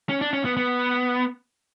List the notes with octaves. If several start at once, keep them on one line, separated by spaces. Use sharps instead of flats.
C#4
D4
C#4
B3
B3